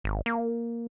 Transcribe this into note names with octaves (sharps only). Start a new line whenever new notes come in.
G#1
A#3